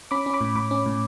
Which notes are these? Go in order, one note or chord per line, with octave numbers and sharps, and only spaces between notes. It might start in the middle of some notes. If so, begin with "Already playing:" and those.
C#4 B5 D6
C#4
B5 D6
A2
A2 B5 D6
C#4
A2